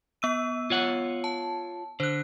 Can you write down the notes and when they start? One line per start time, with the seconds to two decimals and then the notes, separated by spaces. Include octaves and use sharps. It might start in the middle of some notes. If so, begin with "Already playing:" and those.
0.22 B3 E6 D#7
0.70 F4 C#5 F#5
1.24 A5
2.00 D3 C5 F#6